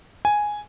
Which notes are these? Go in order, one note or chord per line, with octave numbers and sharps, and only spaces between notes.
G#5